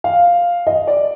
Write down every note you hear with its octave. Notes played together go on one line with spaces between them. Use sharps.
F5
D#5
D5